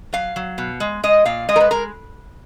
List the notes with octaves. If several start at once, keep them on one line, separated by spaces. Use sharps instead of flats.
F#3 F5
F#3
B2
G#3
G#3 D#5
A#2 F5
G#3 D#5
A#4
B4
G#3 A#4